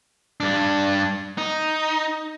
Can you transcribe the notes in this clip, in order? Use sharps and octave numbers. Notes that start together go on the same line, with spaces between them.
G2 D4
D#4